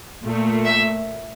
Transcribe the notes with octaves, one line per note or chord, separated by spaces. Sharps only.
A#2 A3
E5